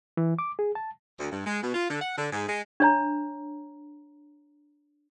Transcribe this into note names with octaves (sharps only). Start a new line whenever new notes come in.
E3
D6
G#4
A5
D2
G2
G#3
B2
F4
D3
F#5
D3
G#2
G#3
D4 C#5 A#5